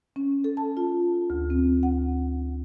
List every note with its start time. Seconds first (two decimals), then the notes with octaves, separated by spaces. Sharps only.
0.16 C#4
0.44 A4
0.57 A5
0.77 F4
1.30 D2
1.50 C4
1.83 F#5